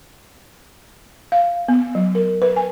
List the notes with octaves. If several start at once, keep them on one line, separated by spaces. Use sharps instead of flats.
F5
B3
F#3
A#4
B4
G#5